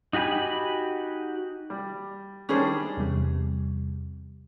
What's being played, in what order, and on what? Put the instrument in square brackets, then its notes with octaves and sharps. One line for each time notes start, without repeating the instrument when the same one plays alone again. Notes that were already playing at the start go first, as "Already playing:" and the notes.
[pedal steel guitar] D#4 F#4 G4 G#5 B5
[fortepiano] G3
[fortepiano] D#3 G3 D4 [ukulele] C#4 G#4 C5
[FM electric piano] E2 C3 G3